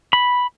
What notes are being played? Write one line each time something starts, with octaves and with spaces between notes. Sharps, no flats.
B5